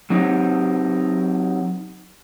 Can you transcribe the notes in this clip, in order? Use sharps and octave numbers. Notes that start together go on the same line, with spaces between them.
F#3 C4 D#4 G4